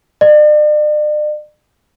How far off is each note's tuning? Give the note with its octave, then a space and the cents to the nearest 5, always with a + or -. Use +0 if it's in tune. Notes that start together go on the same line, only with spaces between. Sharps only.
D5 +40